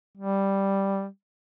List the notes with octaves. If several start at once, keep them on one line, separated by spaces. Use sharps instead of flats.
G3